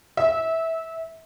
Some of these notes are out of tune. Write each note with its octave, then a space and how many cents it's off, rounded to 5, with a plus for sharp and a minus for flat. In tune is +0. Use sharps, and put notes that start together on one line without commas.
E5 -20